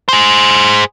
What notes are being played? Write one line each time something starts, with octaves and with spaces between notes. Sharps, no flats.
G#4 C5